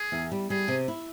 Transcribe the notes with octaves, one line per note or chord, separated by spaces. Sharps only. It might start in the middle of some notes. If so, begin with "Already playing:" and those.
Already playing: G#4
E2
G3
G3 G#4
C3
E4